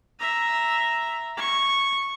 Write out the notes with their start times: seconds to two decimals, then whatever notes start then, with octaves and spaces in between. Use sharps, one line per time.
0.20 E5 A#5
1.37 C#6